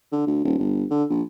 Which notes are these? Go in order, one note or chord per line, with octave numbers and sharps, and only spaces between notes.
D3
D2
D#1
G1
D3
A#1